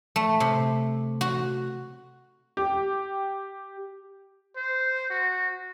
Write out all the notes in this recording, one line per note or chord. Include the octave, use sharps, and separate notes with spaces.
A3
C3
F#4
G4
C5
F#4